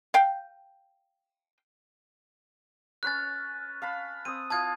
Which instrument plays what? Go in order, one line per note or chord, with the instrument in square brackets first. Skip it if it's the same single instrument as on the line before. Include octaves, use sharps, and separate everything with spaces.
[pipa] F5 G5
[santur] C#4 B4 C#5 [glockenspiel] F#6 A6
[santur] F5 A5 B5
[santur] C4 D#6 [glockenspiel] D#7
[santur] E4 F4 [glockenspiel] A5 D#6 G#6